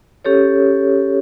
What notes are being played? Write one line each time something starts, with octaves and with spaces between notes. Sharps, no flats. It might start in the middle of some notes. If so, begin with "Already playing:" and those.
C#4 G4 A4 C#5